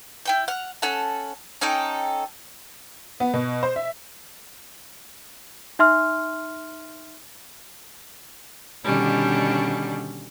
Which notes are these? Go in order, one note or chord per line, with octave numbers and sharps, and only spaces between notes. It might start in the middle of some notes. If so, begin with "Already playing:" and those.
E4 G5 G6
F#5 F6
C#4 A4 F#5 A5
C#4 D#4 A4 G5
B3
B2
C5
E5
D#4 E5 C6 F6
B2 D3 D#3 G3 C#4 D4